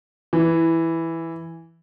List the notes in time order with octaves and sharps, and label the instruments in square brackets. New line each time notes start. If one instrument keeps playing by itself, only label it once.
[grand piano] E3